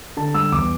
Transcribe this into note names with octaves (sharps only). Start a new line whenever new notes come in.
D3 A5
G3 E6
E2 D6